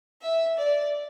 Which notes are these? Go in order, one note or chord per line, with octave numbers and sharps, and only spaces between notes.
E5
D5